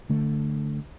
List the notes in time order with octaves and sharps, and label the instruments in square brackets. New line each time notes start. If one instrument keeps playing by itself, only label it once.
[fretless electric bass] D3 A3